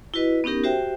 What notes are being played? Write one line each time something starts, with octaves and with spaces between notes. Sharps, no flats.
E4 F#4 B4 D#5
B3 C#4 D#4 G4 A#4
F#4 G4 C5 E5 G5